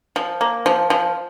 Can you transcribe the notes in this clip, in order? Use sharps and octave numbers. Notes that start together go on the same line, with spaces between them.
F3
A#3
F3
F3